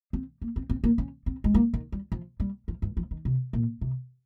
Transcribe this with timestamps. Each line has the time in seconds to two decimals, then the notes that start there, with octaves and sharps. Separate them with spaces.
0.13 C4
0.42 A#3
0.56 C4
0.70 C4
0.84 A#3
0.98 C#4
1.26 C4
1.44 G#3
1.54 A#3
1.74 D#3
1.92 G3
2.12 F3
2.40 G3
2.68 F3
2.82 G2
2.97 F3
3.11 D#3
3.25 C3
3.53 A#2
3.81 C3